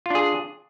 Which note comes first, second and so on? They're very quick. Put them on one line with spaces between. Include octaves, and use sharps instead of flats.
F4 D4 G#4